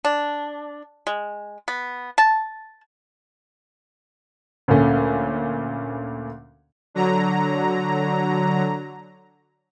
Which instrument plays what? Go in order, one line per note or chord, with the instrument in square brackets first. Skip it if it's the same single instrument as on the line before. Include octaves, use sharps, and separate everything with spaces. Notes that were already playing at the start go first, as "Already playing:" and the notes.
[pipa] D4
G#3
B3
A5
[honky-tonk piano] D2 A#2 A3 C#4
[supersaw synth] D3 F#3 A#5